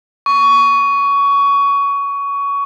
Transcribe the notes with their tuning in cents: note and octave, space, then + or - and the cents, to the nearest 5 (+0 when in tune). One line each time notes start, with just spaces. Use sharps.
C#6 +20